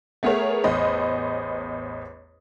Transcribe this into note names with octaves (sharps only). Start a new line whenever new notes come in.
A3 B3 G#4 A#4 C#5
A1 E2 C5 D#5 B5